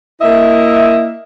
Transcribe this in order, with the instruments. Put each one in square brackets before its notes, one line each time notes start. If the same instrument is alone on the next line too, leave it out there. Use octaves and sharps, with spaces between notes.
[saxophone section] A#3 E4 D#5 E5